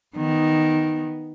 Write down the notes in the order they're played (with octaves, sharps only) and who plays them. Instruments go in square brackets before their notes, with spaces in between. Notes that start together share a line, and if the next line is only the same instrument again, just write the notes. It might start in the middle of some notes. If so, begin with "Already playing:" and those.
[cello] D#3 B3